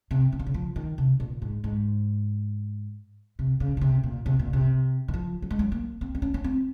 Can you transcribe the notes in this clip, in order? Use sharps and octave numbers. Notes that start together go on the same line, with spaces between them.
C3
C#3
C3
C#3
F3
D#3
C3
A#2
G#2
G#2
C3
C#3
A#2
C3
A#2
C3
A#2
C3
D#3
F3
F#3
G#3
F#3
A#3
C4
C4
C#4
C#4
C4